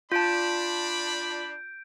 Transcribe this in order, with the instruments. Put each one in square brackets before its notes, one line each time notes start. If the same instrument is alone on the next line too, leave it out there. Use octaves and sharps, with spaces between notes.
[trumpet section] D4 D5 B5 [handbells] F4 A5 [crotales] G6 D7